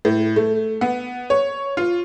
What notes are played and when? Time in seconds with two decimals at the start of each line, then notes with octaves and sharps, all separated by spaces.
0.05 A2
0.36 A3
0.81 B3
1.30 C#5
1.77 F4